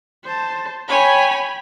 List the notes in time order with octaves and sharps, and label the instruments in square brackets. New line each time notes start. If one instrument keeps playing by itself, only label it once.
[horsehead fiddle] C5 A5
[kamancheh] C#5 G#5 [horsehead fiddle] G5 B5